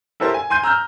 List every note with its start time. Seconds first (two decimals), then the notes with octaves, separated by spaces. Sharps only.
0.20 E4 G4 A4 A#4 C5
0.34 G#5
0.50 G#5 C6 G6 D#7
0.63 A#5 E6 F6 G6